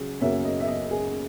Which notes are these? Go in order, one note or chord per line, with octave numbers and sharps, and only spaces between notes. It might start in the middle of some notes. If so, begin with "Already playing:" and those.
Already playing: C#3 F#3 G#4
F#2 C#3 F#3 A#3 C#4 E5
D#5
E5
D#5
G#4